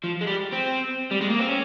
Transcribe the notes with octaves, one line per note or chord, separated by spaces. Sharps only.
F3
G#3
G3
C4
G3
G#3
A#3
C4
C#4